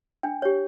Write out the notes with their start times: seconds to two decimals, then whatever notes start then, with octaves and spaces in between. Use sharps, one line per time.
0.23 D4 G5
0.42 G4 C#5